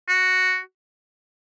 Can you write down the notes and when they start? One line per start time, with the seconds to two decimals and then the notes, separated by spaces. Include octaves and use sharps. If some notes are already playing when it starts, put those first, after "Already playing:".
0.09 F#4